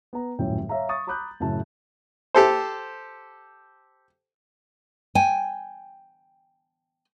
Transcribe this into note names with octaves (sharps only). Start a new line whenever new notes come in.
B3 A#5
D#1 F#2 A2 C#4 G5
C#5 E5 F5 A#5
C#6 D#6 A6
A#5 B5 D6 D#6 F#6 G6
F#2 A2 C#3 A5
G4 A4 C5
G5 G#5